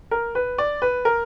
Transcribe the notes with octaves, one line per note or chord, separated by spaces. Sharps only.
A#4
B4
D5
B4
A#4